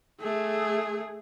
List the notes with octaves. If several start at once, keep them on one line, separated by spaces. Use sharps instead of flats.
A3 G#4